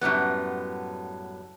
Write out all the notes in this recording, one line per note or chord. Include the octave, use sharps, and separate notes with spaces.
F#2 A2 G3 B3